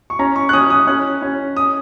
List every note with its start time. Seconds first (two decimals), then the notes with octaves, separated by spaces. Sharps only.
0.10 C#6
0.19 C#4 A#5
0.36 C#6
0.49 F#6
0.53 C#4 D#6
0.70 D#6
0.87 C#4 F#6
1.22 C#4
1.57 D#6